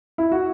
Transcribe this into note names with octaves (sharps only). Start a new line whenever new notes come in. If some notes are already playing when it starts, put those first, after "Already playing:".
E4
F#4